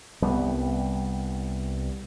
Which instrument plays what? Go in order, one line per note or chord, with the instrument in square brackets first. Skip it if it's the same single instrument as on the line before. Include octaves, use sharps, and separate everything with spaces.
[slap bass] C2 G3 B3